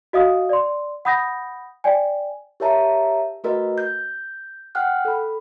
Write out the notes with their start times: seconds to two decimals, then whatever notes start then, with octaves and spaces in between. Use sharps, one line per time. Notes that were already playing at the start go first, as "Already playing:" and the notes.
0.13 F#4 D#5 F5 D#6
0.49 D5 C6
1.05 F#5 B5 D#6 G6 A#6
1.84 D5 G5 G#5
2.60 G4 A#4 C#5 E5 A5 A#5
3.44 A3 F#4 A#4 B4 D#5
3.78 G6
4.75 F#5 G5 F6 F#6
5.05 A4 B5